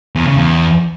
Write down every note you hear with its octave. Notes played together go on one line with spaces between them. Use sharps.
E2
C#3
E2